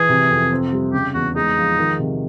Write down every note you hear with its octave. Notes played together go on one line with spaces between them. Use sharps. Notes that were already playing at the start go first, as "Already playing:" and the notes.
Already playing: E3 G#4
C3
F2
C4
G3
C#3 G4
E2 F#4
G#3 D#4
F3
D#3
C3